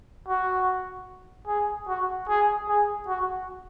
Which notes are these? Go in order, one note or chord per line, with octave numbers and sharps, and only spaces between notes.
F#4
G#4
F#4
G#4
G#4
F#4